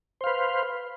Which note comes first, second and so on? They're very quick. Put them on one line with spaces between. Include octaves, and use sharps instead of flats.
C5 F5 B4